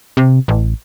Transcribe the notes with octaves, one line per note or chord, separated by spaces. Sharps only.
C3
A1